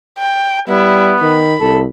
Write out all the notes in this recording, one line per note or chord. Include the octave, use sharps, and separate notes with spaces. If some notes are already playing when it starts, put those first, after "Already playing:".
G5
G3 B3 E4
D#3 B5
C2 A4